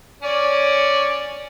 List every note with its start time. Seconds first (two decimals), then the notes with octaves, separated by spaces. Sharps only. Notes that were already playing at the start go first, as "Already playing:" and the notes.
0.22 C#4 C#5 D5